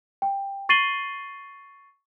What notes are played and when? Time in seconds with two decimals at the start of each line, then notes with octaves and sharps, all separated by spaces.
0.22 G5
0.69 C#6 A6 C7 D#7 F#7 G7